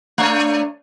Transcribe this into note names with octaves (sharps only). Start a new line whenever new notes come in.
A3 D4 C#5